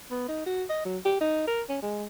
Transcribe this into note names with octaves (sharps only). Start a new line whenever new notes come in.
B3
D#4
F#4
D#5
F#3
G4
D#4
A#4
C#4
G#3